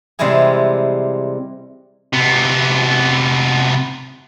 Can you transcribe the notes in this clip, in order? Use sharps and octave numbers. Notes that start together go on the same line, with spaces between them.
C3 E3 G3 G#3 E4 G#4
C3 B3